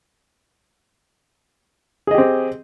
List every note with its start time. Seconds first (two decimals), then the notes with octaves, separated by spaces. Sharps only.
2.07 G#4
2.11 D#5
2.15 G4
2.18 C4